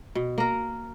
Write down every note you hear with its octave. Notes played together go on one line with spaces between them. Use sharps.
B2
A#3 A#4